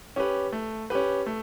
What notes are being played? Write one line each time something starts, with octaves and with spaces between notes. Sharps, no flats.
C#4 G4 B4
A3
C#4 G4 B4
A3